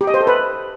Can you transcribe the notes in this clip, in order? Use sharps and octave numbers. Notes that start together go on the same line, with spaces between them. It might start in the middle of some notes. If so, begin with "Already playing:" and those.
G4
D#5
C5
A4
B4